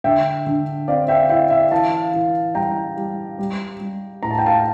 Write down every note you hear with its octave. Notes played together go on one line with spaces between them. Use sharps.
D3 E5 G5
D3
C4 D5 F5
E5 G5
E4 E5 G5
E5 G5
E3 F5 A5
E3
G3 G5 A#5
G3
G3
G3
A2 A#5
A5
G5
F5 A5